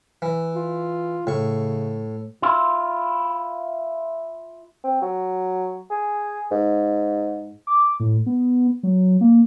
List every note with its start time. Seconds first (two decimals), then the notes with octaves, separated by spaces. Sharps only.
0.22 E3
0.56 F4
1.27 A2 C#3 C#6
2.42 E4 F4
4.84 C4
5.02 F#3
5.91 G#4
6.52 G#2
7.67 D6
8.00 A2
8.26 B3
8.83 F#3
9.21 A#3